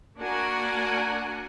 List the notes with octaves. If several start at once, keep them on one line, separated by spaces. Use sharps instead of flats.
A#3 D4 F#4 A#4 F#5 G#5